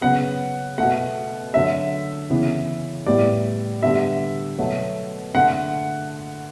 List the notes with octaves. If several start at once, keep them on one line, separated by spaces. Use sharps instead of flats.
C#3 F#3 B3 F#5
B2 A3 F#5
D3 F#3 A3 E5
C#3 E3 B3
A2 G3 B3 D5
D3 G3 B3 E5
B2 F#3 A3
D3 A3 F#5